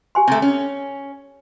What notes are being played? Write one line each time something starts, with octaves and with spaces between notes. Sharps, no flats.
G4 G#5 C6
C3 A3
C#4